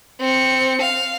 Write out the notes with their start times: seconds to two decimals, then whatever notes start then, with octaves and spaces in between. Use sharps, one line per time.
0.20 C4 C#7
0.82 F5